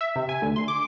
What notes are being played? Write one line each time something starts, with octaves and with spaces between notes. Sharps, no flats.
E5
C3
G#5
D2
C6
D6